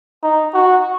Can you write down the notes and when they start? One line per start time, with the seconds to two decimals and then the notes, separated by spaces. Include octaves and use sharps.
0.23 D#4
0.54 F#4